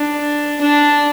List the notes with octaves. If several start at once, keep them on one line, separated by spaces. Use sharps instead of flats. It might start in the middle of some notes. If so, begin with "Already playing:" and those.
Already playing: D4
D4